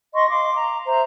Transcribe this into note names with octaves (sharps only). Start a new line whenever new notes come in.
D#5 C6 C#6
F5 C6 D6
A#5
C5 E5 A#5